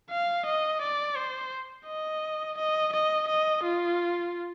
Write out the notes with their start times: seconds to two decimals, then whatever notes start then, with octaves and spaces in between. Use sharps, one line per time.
0.11 F5
0.46 D#5
0.81 D5
1.16 C5
1.87 D#5
2.57 D#5
2.93 D#5
3.28 D#5
3.63 F4